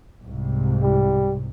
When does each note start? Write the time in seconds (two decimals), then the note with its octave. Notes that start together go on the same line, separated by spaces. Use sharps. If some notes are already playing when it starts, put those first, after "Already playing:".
0.23 C2 G#2 C3
0.82 G3